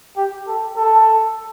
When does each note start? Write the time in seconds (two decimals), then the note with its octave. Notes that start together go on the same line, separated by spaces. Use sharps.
0.17 G4
0.47 A4
0.77 A4